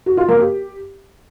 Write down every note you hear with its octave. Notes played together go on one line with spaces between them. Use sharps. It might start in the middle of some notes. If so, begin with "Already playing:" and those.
F#4
F4
A#3
G4